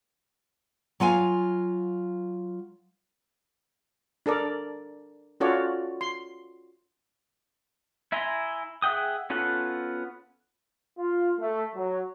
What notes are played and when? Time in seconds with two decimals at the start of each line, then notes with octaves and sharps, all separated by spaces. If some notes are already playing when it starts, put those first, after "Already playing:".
1.00 F#3 F4 F5 G#5
4.26 D4 A4 A#4 D5
5.40 C#4 F4 F#4 A4 C#5 D5
6.01 C6
8.12 E4 E5 G#5 A#5 C6
8.82 G#4 E5 F#5 G5 D#6
9.30 B3 C#4 F4 A4 F#5
10.98 F4
11.38 A3
11.76 F#3